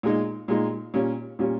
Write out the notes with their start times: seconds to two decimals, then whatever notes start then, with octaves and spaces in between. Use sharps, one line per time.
0.03 A#2 G#3 D#4
0.48 A#2 G#3 D#4
0.94 A#2 G3 C#4
1.39 A#2 G3 C#4